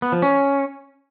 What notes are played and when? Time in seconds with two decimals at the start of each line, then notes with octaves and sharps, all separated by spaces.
0.02 B3
0.12 F3
0.22 C#4